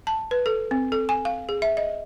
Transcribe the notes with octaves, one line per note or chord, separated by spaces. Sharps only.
A5
B4
A4
C4
A4
G#5
F5
G#4
E5
D#5